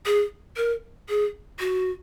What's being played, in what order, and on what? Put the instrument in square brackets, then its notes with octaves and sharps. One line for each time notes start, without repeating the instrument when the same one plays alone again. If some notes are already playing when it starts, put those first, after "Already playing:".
[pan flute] G#4
A#4
G#4
F#4